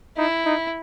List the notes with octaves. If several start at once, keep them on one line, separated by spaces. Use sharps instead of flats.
D#4 E4
D#4